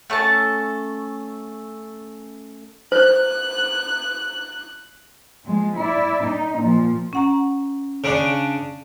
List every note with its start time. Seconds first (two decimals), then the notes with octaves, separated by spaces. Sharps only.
0.10 A3 C#4 A4 A5
2.92 C5 F#6
5.45 F3 G#3
5.77 E4 D5
6.24 D#4
6.59 A#2 F3
7.13 C#4 F#5 A#5
8.04 C#3 D4